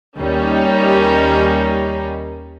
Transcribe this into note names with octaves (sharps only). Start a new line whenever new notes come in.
D#2 G3 A#3 C#4 D#4